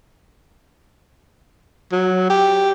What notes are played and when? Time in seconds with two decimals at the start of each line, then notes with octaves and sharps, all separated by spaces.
1.92 F#3
2.30 G4